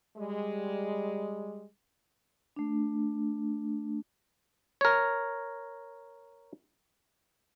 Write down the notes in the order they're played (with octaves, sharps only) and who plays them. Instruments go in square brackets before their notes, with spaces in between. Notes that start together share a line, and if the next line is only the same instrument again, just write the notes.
[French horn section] G3 G#3
[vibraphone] A3 D4
[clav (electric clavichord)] A#4 C#5